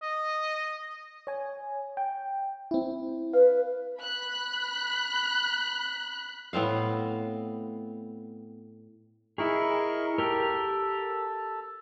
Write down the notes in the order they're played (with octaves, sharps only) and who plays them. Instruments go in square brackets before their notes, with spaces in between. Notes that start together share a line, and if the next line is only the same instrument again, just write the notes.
[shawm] D#5
[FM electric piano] C#5 G#5
G5
C4 E4
[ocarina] B4 [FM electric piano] F5
[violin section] B5 F#6
[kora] A2 B3 C4 F5
[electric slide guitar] E4 G#4 [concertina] A#4 D#5 C#6
[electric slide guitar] G4 A#4 [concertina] A4